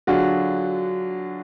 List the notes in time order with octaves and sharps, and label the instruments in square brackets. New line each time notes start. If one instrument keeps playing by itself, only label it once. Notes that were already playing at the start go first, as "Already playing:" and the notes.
[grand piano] D3 F#3 D4 F4 G#4 [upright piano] F#4